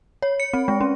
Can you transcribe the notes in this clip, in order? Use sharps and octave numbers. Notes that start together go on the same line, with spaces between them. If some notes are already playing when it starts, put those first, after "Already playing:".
C#5
C#7
C4
G#3
C#4